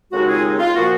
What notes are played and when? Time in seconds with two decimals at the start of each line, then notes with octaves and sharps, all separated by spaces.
0.11 D#2 C#3 G#3 C4 D#4 F#4
0.27 F4 G#4
0.58 F4
0.75 A#2 F3 A#3 F#4